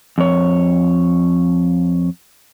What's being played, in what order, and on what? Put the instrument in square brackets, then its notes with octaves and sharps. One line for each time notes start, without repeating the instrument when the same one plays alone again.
[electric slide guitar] F2 C#5